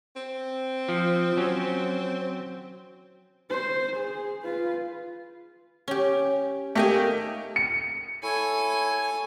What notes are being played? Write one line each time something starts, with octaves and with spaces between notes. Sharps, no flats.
C4
F3
F#3 C#4
C5
G#4
F4 B4
C#4 G4
A3 A#3 D#4 G4 G#5
C#7
E4 A4 C#5 G#5